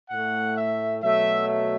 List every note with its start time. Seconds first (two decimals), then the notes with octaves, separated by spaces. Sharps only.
0.10 A2 A3 F#5
0.57 E5
1.02 B2 F#3 A3 E5
1.48 E5